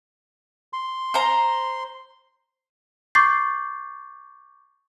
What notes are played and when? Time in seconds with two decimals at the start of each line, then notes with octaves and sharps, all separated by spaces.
0.73 C6
1.14 C5 A#5
3.15 C#6 D6 G6 A6 C7